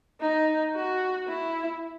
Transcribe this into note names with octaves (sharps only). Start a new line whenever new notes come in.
D#4
F#4
E4